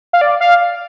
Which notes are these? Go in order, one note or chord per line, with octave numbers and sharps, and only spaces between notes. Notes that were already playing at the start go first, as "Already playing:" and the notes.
F5
D5
F5